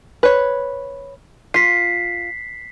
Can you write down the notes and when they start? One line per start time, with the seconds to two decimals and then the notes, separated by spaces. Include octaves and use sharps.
0.23 B4 C#5
1.54 F4 B6 C7